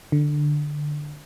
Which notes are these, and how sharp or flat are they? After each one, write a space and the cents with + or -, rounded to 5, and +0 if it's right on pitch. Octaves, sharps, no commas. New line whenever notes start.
D3 +10